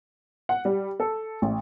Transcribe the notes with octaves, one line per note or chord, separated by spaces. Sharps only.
F#5
G3
A4
A1